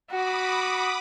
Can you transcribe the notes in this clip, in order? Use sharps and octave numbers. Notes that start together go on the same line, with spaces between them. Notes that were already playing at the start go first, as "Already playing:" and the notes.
F#4 B5 D6 D#6